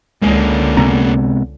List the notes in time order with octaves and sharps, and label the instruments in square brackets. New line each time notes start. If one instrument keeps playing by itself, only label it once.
[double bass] C#2 D3 [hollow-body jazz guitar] G#3 [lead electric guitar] A#3 C#4
[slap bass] C3 G#3 B3 [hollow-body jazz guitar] A#5